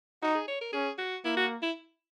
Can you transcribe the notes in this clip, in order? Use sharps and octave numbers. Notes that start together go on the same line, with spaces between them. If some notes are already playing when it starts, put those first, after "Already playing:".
D#4 F#4
G#4
C#5
A#4
C#4 G#4
F#4
A#3 E4
F#4
E4